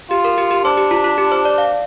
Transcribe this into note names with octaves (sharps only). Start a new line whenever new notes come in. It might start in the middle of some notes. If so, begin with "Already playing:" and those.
F4 G4
A#4
G4
G4
D4 C5
G4
F4
F4
G4
C5
D5
F5